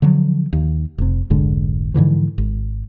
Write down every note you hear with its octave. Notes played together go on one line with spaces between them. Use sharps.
D3 F3 F#3
D#2
F1 C3
F1 B1 G#2 D3
G#2 D3 E3 F3
G#1